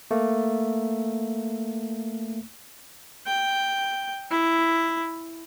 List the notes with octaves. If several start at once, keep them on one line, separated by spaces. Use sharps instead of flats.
A3 A#3
G5
E4